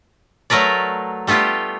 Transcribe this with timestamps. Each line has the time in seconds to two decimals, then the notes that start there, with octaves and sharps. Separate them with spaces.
0.50 F#3 A3 A#4 B4 D5
1.27 G3 A3 B3 F4 G4